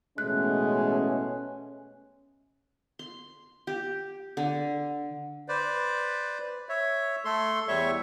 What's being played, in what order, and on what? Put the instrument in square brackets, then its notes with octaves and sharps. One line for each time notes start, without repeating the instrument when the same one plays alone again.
[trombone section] A1 B2 A3 [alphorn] G#3 [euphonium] C#4 [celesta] F#6
[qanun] C6
G4
D3
[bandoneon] B4 C5 D5
C#5 E5
A3 A4 C6
E2 G3 C#5 E5 C#6